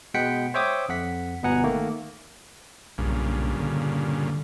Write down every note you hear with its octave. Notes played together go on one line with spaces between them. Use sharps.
B2 G#3 F#5 G5 B6 C#7
C5 C#5 E5 G5 D6 D#6
F2 F#5 B6
G1 B2 B3 F#5 G#5 A#5
D#3 A3 A#3
B1 G2 A#2 C#3
D3